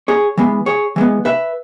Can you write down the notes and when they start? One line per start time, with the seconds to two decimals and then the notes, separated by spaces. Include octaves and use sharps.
0.08 G#4 C#5
0.37 E3 G#3 B3
0.66 G#4 C#5
0.96 E3 G#3 B3
1.25 B4 E5